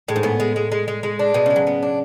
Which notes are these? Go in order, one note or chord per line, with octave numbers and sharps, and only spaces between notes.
A2 G#3
G#2
A2 B3
G#3
G#3
G#3
G#3
G#3
D4
B2 G#3
C#3 G#3
F#3
B3
D4